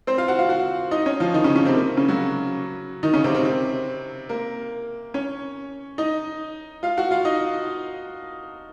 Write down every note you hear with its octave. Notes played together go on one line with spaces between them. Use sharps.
C4 C5
F4 F5
F#4 F#5
F4 F5
F#4 F#5
D#4 D#5
C#4 C#5
F3 F4
D#3 D#4
C#3 C#4
C#3 C#4
C3 C4
A#3
C#3 C#4
F#3 F#4
D#3 D#4
C#3 C#4
C3 C4
C3 C4
C3 C4
A#3 A#4
C#4 C#5
D#4 D#5
F4 F5
F#4 F#5
F4 F5
D#4 D#5